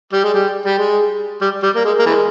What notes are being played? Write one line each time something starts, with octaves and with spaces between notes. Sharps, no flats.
G3
G#3
G3
G3
G#3
G3
G3
A#3
G#3
A#3
E3 G#3